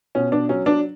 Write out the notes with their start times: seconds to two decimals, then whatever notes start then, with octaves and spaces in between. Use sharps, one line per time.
0.15 B2 C#4
0.32 D4
0.49 F#3 C#4
0.66 D4